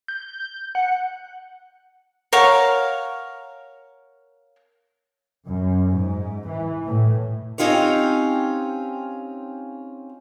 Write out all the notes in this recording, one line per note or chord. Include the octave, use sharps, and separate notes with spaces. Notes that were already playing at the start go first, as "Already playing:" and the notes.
G6
F#5
A#4 C#5 F5 F#5
F#2
G#2
E3
A2
C4 C#4 D#4 F4 G4 C#5